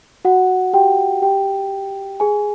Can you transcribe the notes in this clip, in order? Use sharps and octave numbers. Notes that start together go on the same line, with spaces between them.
F#4 F#5
G4 G5
G4 G5
G#4 G#5